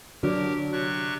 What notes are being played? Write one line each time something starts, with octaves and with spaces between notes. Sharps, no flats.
D3 F#3 D4 G4 A#4
C3 C#6 F#6